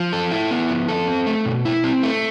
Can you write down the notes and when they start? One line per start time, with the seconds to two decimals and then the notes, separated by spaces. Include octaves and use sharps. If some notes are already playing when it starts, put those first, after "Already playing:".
Already playing: F3
0.13 A4
0.31 E4
0.51 B3
0.70 F3
0.88 A4
1.08 C4
1.27 A3
1.46 B2
1.65 E4
1.84 C4
2.03 A3